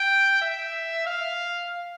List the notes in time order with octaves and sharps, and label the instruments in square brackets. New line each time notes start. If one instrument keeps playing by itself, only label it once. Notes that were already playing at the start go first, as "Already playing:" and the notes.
Already playing: [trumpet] G5
E5
F5